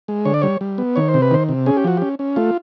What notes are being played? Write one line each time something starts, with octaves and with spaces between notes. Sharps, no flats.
G#3
D3 C#5
D5
G3 C#5
G3
B3
D#3 C#5
C5
C3
B4
D#3 C5
C3
C#4 G#4
G4
F3 F#4
C#4 G4
C#4
A3 F4